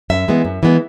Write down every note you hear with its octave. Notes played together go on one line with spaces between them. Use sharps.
F#2 E5
E3 G#3 B3
F#2
E3 G#3 B3